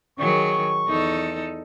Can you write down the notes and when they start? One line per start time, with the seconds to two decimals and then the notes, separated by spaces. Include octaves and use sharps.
0.19 D#3 F#3 G#4 C#6
0.87 E2 D#4 A4